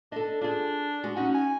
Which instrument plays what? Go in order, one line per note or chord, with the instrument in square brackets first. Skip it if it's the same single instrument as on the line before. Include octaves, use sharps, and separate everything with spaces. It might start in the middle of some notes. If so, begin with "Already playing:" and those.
[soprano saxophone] D4 [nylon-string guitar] A4 D#5
[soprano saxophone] D4 [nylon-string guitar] F4 G#4
[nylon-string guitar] G#3 F#4
[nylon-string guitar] C#4 D#4 [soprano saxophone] F#4
[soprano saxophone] G#5